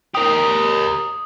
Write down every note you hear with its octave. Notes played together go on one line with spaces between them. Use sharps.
G4 A#4 D#6